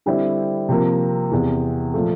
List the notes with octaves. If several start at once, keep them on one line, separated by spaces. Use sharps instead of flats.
D3 G3 C4 E4
C3 F3 A#3
E2 C3 E3
A#2 F3 A3